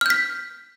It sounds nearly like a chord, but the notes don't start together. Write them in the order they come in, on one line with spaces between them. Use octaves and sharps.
F6 G6 B6